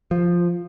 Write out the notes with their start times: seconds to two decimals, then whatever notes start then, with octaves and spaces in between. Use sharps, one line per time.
0.11 F3